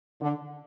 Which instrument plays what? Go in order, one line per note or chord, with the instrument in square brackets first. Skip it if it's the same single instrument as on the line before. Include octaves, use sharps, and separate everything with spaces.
[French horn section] D3